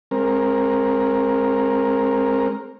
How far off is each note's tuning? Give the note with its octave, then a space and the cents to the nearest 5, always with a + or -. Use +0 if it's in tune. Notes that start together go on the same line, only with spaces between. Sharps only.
G#3 +0 C4 +30 A#4 +0